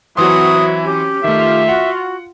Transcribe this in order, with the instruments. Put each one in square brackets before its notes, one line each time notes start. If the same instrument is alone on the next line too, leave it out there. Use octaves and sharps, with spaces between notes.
[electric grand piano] E3 C6 [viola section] F#3 C4 F#4 [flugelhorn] E4 [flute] D#6
[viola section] C#4 [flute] G4
[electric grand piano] D#3 A3 [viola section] F4 [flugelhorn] E5
[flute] F#4 [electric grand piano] F#5